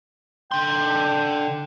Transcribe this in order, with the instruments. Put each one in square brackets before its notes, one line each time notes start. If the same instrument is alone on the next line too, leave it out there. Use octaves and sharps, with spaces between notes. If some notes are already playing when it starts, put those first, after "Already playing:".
[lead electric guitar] D3 C6 [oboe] G5